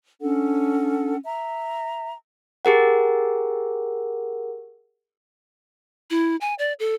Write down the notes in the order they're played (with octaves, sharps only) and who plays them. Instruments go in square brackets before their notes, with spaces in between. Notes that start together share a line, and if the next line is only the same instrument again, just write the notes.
[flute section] C#4 D4 A4 F#5
E5 A#5
[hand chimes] G4 G#4 A#4 F#5
[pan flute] E4
G#5
D5
A4